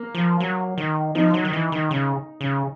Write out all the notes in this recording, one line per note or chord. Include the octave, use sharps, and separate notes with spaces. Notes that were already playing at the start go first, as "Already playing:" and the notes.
Already playing: A#3
F3
F#3
D#3
F3 D#4
F#3
D#3
E3
D#3
C#3
C#3